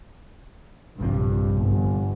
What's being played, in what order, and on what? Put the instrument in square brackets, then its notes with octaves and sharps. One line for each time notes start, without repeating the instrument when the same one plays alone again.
[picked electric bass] A#1 C3 F3 [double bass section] G2
[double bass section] G1